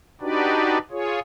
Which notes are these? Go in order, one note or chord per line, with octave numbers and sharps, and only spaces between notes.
D4 D#4 F#4 G4 B4 D5
F4 G#4 C#5